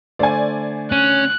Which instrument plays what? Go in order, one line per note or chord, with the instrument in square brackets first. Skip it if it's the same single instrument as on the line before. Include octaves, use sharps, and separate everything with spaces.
[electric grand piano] D3 A3 C5 [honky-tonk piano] D5 G#5
[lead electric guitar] C#4 [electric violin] F#6